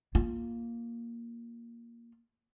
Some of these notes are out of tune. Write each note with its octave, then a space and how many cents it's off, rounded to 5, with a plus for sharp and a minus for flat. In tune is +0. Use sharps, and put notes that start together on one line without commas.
A#3 +5 F4 +0